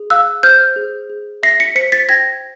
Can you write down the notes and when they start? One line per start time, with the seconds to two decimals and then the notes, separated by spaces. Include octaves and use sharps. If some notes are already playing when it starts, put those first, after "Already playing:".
Already playing: G#4
0.10 F5 E6 F#6
0.43 C5 F6 G6
0.76 G#4
1.10 G#4
1.43 E5 A#6 C7
1.60 B6 C#7
1.75 C5 B6 C#7
1.92 A6 B6
2.09 G5 G#6 A#6